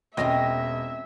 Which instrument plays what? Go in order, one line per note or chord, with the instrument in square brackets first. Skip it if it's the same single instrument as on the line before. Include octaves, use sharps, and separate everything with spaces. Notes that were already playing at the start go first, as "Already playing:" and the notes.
[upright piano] E1 D#5 A#6 [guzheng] C4 C#4 F4 [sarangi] E5